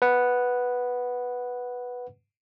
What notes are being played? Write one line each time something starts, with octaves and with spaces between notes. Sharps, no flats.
B4 F#5